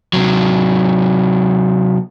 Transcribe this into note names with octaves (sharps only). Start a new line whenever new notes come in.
C3 F#3